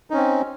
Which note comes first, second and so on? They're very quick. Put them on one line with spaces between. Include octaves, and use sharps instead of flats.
D#4 C#4 C4